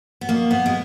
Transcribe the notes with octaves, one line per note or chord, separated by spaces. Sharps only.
B3
B2 A#3
B3
G#3